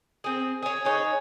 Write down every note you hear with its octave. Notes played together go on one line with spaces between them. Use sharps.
C4 G#4
G#4 C#5
D#4 G#4 B4 C#5